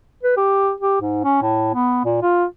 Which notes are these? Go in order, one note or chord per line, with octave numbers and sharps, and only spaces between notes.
B4
G4
G4
G#2
C#4
A2
B3
A#2
F4